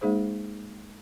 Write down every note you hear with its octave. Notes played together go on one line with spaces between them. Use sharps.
G#3 A#3 D#4 G#4 C5